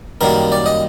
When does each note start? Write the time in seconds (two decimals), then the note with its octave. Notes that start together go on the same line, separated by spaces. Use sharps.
0.21 F#2 D#3 G3 A#3 A#4
0.52 D5
0.66 D#5